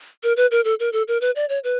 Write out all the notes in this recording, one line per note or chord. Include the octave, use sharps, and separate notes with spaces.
A#4
B4
A#4
A4
A#4
A4
A#4
B4
D5
C#5
B4